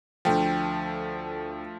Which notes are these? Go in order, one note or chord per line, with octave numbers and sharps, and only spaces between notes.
D2 F3 A3 G5